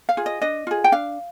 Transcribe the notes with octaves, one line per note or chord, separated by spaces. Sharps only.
F5
F4 G#4
D#5
D4 D#5
F4 G#4
G5
D4 F5